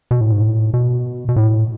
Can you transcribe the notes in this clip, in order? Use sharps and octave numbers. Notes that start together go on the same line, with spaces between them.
B2
A2
G#2
A2
B2
B2
A2